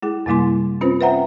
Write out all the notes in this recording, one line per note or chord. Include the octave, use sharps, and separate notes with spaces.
G#3 E4 G#4
F#2 C3 G3 A#3 E4 C6
C4 C#4 F4 B4 C5
B4 C5 E5 F#5 G5 A#5